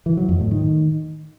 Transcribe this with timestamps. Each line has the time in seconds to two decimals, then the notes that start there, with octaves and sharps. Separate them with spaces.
0.06 E3
0.17 F#3
0.29 F2
0.40 A2
0.51 D#3